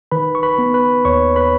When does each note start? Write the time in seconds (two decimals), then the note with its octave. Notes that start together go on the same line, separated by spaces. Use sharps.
0.11 D#3 B4 B5
0.35 C#6
0.43 B4 B5
0.58 B3
0.74 B4 B5
1.05 D#2 C#5 C#6
1.36 B4 B5